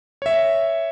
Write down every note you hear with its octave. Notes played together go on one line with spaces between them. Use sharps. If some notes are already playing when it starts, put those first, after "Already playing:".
C#5 E5